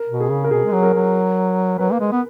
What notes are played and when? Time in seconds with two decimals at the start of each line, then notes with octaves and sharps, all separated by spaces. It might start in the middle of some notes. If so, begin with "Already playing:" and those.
Already playing: A#4
0.09 B2
0.20 G#4
0.31 C#3
0.44 A#4
0.51 B2 G#4
0.65 G#3
0.72 F#3
0.83 A#4
0.94 F#3
1.78 F#3 B4
1.92 A#3
2.00 G#3
2.12 B3